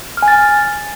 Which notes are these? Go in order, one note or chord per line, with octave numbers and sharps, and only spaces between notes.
F6
G#5
A6